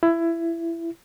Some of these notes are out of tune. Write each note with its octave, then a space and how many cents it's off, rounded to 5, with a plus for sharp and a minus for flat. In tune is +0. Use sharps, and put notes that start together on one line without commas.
E4 +20